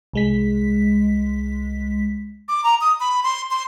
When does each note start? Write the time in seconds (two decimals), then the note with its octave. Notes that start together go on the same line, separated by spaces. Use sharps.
0.13 C2 G#3 B6
2.48 D6
2.64 A#5
2.81 D#6
3.00 B5
3.24 C6
3.51 C6